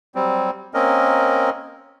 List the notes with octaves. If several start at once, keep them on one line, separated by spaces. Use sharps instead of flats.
F#3 G3 C4
A#3 C4 C#4 A#4 D#5